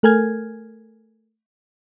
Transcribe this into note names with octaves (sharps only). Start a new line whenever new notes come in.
A3 A4 A#4 G#5 F6 G#6